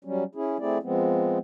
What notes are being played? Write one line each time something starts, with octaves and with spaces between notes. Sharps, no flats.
F#3 G3 C#4
C#4 E4 G#4
A3 C4 E4 G#4 D5
F3 G#3 B3 C4